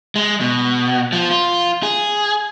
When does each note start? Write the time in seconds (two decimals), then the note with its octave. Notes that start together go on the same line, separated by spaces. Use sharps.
0.16 G#3
0.40 B2
1.12 F3
1.31 F4
1.83 G#4